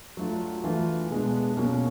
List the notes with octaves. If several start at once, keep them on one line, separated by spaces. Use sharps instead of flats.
F#3 A3 D4 F4
E3 A3 D4 F4
B2 G#3 B3 D4
B2 F#3 A#3 C#4 F#4